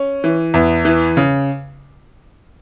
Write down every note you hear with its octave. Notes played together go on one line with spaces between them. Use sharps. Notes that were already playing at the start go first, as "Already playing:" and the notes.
Already playing: C#4
E3
E2
E3
C#3